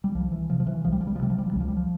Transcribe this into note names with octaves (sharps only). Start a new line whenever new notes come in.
G3
C2 F3
E3
C3 F3
F3
E3
C2 F3
G3
F3
G3
F3
C3 G3
F3
G3
F3
C#2 G3
F3
G3
F3